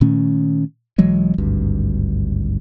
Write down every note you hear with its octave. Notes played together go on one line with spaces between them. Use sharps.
A#2 D#3 A3 C#4
B1 E3 F#3 G#3
G#1 D2 G2